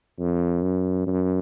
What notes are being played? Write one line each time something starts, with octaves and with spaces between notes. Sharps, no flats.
F2
F#2
F#2